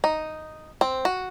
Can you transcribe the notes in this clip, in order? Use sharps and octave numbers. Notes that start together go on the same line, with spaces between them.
D#4
C4
F#4